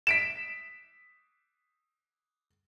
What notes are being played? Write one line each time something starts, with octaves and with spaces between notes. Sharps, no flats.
B6 D7 E7